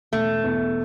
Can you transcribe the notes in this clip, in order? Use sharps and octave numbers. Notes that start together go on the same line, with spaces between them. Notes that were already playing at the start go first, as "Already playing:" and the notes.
E1 A3
E2